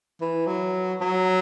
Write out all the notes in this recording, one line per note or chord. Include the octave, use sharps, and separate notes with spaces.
E3
F#3
F#3